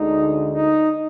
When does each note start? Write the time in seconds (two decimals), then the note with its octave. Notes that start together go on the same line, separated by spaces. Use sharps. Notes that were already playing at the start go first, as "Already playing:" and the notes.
Already playing: D2 D3 G#3 D#4
0.50 D#4